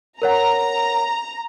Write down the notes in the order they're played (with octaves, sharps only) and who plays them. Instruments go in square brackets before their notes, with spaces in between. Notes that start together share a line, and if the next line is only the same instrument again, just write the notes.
[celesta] A#4 C#5 F#5 [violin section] A#5